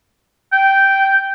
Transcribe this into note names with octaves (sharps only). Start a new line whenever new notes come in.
G5